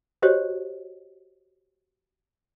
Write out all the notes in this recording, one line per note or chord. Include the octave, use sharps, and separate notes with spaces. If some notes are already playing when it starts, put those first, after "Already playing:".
F#4 G4 C5 C#5 D#5